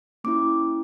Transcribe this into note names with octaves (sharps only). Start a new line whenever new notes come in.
A#3 C#4 E4 D6